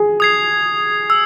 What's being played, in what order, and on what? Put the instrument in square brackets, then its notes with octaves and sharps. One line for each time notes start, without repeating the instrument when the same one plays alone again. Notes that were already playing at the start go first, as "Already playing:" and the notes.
Already playing: [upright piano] G#4
[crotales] D#6 G#6 C7
E6